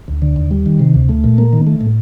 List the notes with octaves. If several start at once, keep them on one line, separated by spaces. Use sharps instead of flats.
D2
D3
D#2
G3
D#3
C3
D2
A3
A#2
A#3
D#3
A3
A2